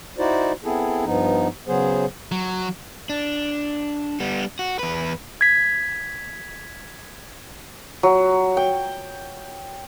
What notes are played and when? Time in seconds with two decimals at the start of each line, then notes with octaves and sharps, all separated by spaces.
0.18 D#4 E4 F#4 C5 D5
0.64 B3 C4 E4 G#4 A4
1.05 G2 F3 B3 D#4
1.68 C#3 F#3 B3 G#4 C5
2.32 F#3
3.09 D4
4.20 G3 B3
4.59 F#4
4.79 E2 B4
5.41 G#6 B6
8.03 F#3
8.57 G5